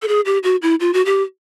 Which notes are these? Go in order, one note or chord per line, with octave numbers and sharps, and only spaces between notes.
A4
G#4
G4
F#4
E4
F4
F#4
G4